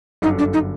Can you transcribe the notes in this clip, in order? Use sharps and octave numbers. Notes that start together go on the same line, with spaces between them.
G1 F#2 D3 D#4
D4
D#4